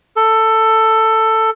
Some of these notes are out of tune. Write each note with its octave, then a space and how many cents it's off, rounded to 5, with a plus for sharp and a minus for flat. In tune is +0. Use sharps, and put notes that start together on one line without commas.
A4 +15